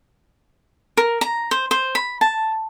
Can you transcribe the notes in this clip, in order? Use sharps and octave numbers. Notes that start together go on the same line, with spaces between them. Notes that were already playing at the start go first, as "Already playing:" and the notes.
A#4
A#5
C5
C5
B5
A5